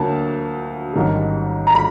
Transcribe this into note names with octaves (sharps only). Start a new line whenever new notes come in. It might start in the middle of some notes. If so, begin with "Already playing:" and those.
Already playing: D2 D3 F#3 A#3 A5
A1 G#2 D#3 G3
A#5
B5